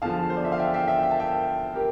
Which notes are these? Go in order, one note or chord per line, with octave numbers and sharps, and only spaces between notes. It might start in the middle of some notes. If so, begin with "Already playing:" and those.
E2 D3 F3 F5 A5
C5
D5
E5
F5
E5 G5
E5 G5
E5 G5
G5
A5
E5 G5
G4 A#4